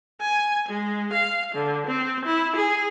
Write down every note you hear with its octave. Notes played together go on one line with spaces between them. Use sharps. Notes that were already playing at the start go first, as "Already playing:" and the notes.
G#5
G#3
F5
D3
C4
E4
G#4